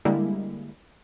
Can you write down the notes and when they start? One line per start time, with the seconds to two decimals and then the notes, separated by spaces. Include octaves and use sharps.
0.05 D3 G3 G#3 A#3 E4